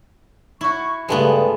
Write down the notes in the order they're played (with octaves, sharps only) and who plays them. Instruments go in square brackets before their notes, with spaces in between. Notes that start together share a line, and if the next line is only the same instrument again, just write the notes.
[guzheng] E4 F#4 [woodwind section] C#6
[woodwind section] G2 C#3 [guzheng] G#3 A3 B3